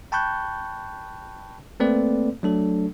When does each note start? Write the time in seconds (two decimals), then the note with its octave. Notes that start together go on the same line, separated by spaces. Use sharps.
0.12 G5 A5 B5 C#6 F#6 G6
1.80 A3 A#3 C4 A4 B4 D5
2.43 F#3 A3 D4 A4